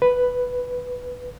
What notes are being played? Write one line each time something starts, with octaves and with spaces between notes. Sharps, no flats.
B4